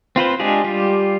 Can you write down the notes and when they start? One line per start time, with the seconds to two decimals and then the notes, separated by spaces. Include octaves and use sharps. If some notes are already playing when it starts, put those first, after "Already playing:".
0.16 C4 F4 B4 C5
0.40 G#3 D4 F4 G4 G#4
0.64 G3 F4 G4